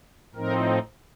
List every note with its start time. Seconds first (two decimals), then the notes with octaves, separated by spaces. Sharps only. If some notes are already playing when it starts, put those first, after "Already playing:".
0.35 A2 F3 C4 D#4 A#4